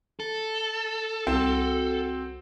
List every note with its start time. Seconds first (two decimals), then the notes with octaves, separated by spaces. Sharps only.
0.20 A4
1.27 C2 C4 F#4